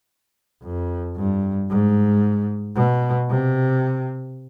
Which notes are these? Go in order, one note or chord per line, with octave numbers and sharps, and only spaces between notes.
F2
G2
G#2
B2
C3